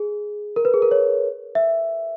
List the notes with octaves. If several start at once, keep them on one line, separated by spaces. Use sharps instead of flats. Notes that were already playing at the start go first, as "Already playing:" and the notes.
Already playing: G#4
A#4
B4
G#4
A#4
C#5
E5